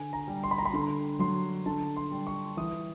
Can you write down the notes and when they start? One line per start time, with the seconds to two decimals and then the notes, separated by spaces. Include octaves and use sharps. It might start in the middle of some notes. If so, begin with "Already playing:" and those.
Already playing: D3 G#5
0.13 A#5
0.28 G3
0.44 C6
0.51 B5
0.58 A#5
0.65 B5
0.73 D3 C6
1.19 F#3 C6
1.66 D3 A5
1.97 C6
2.11 G3
2.27 C#6
2.57 E3 D#6